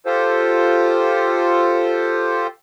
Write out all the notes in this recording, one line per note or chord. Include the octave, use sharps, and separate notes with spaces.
F4 G4 A4 C5